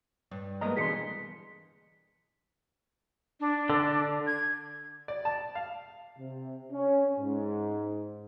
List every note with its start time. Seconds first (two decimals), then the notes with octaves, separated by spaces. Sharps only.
0.31 G2
0.61 G#3 A#3 B3 D#5 A#5
0.77 B2 D3 E3 G#4 C6 B6 C#7
3.40 D4
3.70 D3
4.27 G#6
5.08 D5
5.25 A5
5.55 F5
6.19 C3
6.72 C#4
7.19 G#2